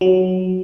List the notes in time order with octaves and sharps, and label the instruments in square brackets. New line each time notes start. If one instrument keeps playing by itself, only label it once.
[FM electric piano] F#3